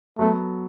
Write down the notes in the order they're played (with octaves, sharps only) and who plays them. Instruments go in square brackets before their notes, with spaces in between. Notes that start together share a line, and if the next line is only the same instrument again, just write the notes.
[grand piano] F#3 B3 A4 [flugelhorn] A3